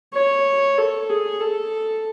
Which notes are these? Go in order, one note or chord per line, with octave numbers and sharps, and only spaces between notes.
C#5
A4
G#4
A4